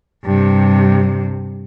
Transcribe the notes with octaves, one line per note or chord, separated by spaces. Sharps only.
G2 C3